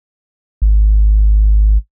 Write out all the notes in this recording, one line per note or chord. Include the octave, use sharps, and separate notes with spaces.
G#1